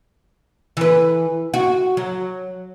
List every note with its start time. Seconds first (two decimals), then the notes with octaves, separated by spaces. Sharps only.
0.77 E3 B4
1.54 F#4
1.97 F#3